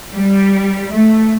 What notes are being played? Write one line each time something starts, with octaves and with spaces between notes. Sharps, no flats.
G3
A3